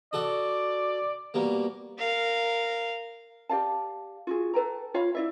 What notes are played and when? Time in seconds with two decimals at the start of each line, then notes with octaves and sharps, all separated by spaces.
0.13 F#4 A4 D5 D#6
1.34 B2 G3 A#3
1.98 A#4 F5
3.49 G4 D5 F5 A5
4.27 F4 F#4 G#4
4.54 A4 B4 G5 A#5
4.94 F4 C#5 F5 B5
5.15 E4 D5 E5